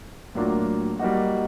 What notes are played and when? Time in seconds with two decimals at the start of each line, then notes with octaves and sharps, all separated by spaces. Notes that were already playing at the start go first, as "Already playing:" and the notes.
0.35 A2 F#3 A#3 D4 F4
0.99 G3 A#3 D#4 F#4